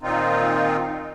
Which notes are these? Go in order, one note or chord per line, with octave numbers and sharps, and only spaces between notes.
A#2 D#3 C4 D#4 F4